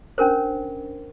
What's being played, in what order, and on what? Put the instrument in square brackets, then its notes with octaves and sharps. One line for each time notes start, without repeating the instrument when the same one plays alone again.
[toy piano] C#4 D4 A#4 C5